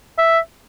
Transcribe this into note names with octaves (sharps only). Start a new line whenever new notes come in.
E5